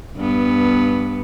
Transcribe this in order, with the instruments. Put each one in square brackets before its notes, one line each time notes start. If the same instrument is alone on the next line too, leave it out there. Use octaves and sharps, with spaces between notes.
[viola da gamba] G2 B3